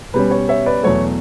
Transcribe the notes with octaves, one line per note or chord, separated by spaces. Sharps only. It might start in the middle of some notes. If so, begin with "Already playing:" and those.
B2 G3 C#4 B4
C#5
C#5 E5
B4 D5
E2 B2 F#3 A3 C#5